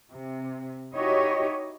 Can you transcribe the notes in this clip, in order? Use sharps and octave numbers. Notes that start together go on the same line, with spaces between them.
C3
D#4 E4 F#4 G4 C#5 D#5